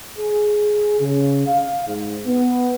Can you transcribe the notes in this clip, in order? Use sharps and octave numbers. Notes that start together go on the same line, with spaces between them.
G#4
C#3
F5
G#2
B3